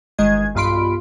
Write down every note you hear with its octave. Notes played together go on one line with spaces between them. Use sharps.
G1 D#3 G#3 D#5 G#6
B1 G2 F4 B5 C6 D7